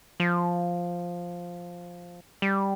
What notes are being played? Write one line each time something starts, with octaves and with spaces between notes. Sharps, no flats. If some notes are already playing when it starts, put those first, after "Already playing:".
F3
G3